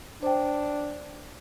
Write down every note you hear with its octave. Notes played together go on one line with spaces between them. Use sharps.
D4 C5 G5